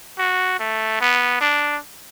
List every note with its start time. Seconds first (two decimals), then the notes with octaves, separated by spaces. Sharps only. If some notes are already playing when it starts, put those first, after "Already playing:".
0.19 F#4
0.59 A3
1.00 B3
1.41 D4